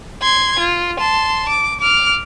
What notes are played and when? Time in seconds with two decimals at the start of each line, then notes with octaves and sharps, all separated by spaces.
0.22 C6 G#6
0.59 F4
0.99 A5 C6
1.49 D6
1.80 D6 F6